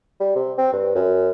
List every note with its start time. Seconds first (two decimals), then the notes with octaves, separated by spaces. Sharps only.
0.20 G3
0.36 C3
0.58 C4
0.73 G2
0.95 F#2